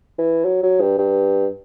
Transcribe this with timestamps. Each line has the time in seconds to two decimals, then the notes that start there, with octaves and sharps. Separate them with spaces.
0.19 E3
0.45 F#3
0.63 F#3
0.81 G2
0.98 G2